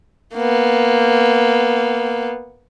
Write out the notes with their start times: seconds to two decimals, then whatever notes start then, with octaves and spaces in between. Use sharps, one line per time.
0.35 A#3 B3